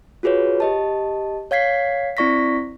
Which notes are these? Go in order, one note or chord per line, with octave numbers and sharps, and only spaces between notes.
F4 F#4 G#4 B4 C#5
G4 D#5 A5
C#5 F5 G#6 B6 C7
C4 E4 D5 C#6 A#6 B6